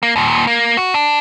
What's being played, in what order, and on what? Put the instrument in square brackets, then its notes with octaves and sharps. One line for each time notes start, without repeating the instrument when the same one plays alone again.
[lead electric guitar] A#3
D#2 A#2
A#3
F#4
D4